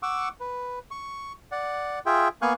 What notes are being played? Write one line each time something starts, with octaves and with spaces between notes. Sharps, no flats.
F#5 C#6 D6 E6
B4
C#6
D5 F#5
F4 G#4 E5 G5
A#3 B3 F5 G#5 C#6 F#6